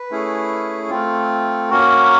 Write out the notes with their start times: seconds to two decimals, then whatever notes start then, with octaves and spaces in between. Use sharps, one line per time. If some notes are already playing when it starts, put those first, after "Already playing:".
Already playing: B4
0.11 A3 C#4 E4 G#4
0.90 A3 C4 F4
1.70 A#3 C#4 F#4 A#4